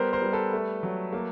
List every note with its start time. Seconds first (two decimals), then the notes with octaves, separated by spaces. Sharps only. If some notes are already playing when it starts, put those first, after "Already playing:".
Already playing: G3 B3 A#4 C5
0.13 A#4 C5
0.22 G3
0.33 A4 B4
0.53 A3
0.83 F#3
1.13 A#3